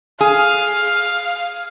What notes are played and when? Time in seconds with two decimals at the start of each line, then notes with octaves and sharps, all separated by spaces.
0.21 G#4 F5